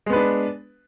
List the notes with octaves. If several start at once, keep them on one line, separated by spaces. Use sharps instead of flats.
G#3 B3 D4 B4